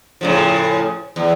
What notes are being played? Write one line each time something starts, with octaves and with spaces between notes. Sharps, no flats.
A2 C#3 F3
E2